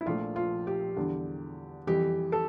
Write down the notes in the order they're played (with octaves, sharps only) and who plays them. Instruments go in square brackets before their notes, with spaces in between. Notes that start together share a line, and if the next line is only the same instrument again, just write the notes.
[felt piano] E4
A#1 A#2 F3 A3 F4
F4
G4
E2 D3 G3
F2 E3 G3 G4
A4